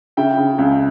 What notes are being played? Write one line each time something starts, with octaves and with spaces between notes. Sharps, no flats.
C#3 E5 G5
C#3
C#2